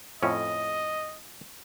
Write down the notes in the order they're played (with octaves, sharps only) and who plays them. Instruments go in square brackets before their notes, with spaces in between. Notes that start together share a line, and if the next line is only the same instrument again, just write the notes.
[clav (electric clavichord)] F2 A2 C#4 [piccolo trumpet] D#5